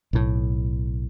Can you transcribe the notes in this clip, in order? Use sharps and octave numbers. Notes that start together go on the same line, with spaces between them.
B1 A2